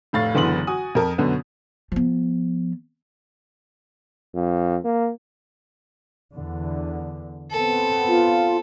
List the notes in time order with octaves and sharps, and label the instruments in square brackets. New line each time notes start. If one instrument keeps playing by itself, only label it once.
[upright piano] F1 A2 F5 A6
F#1 D3 E3 B3 C6 F#7
F#4 G#5 D#6
F2 A#4 A5
F#2 B2 D3 B3
[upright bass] F3 B3
[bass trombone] F2
A#3
[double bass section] E2 D3
[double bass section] B3 C4 [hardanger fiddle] A4
[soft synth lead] F4